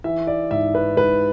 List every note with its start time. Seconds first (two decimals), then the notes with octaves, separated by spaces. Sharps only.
0.04 E3 E5
0.27 D5
0.51 G#2 E5
0.75 B4
0.97 G#2 B4